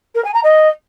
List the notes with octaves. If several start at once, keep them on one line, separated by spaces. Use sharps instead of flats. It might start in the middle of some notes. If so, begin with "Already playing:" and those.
A#4
G#5
A#5
D#5